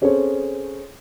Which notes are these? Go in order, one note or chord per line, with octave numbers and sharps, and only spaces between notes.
C4 C#4 G#4 A4 C5 C#5